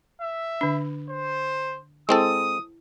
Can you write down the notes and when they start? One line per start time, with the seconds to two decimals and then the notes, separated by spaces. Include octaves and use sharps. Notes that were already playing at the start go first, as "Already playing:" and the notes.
0.21 E5
0.61 D3 D4
1.10 C5
2.09 G#3 C4 E4 A4 D#6